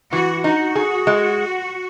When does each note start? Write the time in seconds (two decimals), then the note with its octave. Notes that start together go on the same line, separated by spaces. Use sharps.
0.12 E3 F#4
0.44 D#4 F#4
0.76 G#4
1.07 G#3